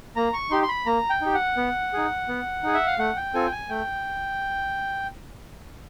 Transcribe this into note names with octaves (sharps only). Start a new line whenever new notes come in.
A#3 A#5
C#6
D#4 G4 C6
C6
B5
A#3 A#5
G5
D#4 G4
F#5
B3
D#4 G#4
B3
D#4 G#4
E5
F5
A3 F#5
G5
C4 F4 A4 G#5
G5
G#5
A3 G5